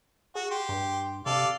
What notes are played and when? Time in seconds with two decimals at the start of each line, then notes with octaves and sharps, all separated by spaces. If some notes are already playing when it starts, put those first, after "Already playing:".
0.35 F#4 G#4
0.51 G4 C6
0.69 G2
1.26 C3 A4 D5 F5